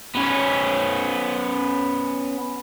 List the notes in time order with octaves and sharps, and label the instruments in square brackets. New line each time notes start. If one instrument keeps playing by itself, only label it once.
[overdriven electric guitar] B3 C#4